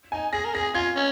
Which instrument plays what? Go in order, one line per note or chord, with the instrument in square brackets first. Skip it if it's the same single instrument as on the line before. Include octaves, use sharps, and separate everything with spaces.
[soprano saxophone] D#4 [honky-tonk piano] G#5
[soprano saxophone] G#4 [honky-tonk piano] A#6
[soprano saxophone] A#4
[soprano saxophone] G#4 [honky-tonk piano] A#6
[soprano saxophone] F4 [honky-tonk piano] G#6
[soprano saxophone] C#4